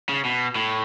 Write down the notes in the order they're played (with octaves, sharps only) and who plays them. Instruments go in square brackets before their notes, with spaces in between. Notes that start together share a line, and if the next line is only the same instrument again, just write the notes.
[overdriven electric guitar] C#3
B2
A2